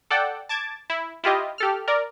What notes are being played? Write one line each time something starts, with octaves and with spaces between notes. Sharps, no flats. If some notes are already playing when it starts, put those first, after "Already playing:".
A4 D5 F#5 G5
A5 D6 G#6 A6
E4
E4 F4 G4 D#5
G4 A4 F6
A#4 D5